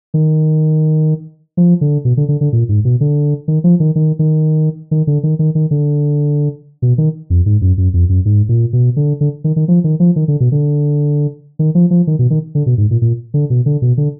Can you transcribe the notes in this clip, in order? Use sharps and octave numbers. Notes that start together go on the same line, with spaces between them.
D#3
F3
D3
B2
D3
D3
D3
A#2
G#2
B2
D3
D#3
F3
D#3
D#3
D#3
D#3
D3
D#3
D#3
D#3
D3
B2
D#3
F2
G#2
F#2
F#2
F2
F#2
G#2
A#2
B2
D3
D3
D#3
D#3
F3
D#3
F3
D#3
D3
B2
D3
D#3
F3
F3
D#3
B2
D#3
D3
B2
G#2
A#2
A#2
D3
B2
D3
B2
D3